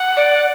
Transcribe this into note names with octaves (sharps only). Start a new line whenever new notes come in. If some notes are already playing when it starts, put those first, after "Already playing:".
Already playing: F#5
D5